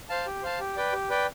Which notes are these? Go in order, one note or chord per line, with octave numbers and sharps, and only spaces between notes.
C5 F5 A5
G4
C5 F5 A5
G4
B4 D5 G5
G4
B4 D5 G5